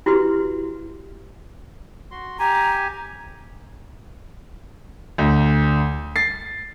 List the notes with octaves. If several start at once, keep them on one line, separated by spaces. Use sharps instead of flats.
E4 F#4 G4 B4 C6
F#4 C6
G4 G#5 A#5
D2
A6 C7